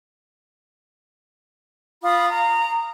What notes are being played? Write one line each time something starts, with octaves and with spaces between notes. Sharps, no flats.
F4 B5 D#6
A#5